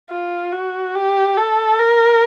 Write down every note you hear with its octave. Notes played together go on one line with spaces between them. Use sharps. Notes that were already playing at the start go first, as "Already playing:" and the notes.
F4
F#4
G4
A4
A#4